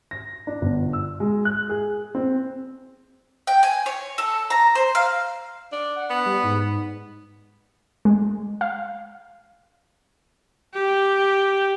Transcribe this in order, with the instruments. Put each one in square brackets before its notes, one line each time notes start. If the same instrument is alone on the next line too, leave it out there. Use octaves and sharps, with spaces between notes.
[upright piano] A#6
D4
G1
E6
G#3
F#6
G#4
C4
[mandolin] G5
G#5
C#5
A4
A#5
C5
F5
[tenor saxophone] D4
[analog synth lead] F#5
[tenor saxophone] B3
[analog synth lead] G3
G#2
[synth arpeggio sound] G#3
F5
[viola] G4